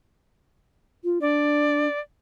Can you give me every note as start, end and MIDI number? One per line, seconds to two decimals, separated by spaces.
1.04 1.19 65
1.21 1.88 62
1.21 2.00 74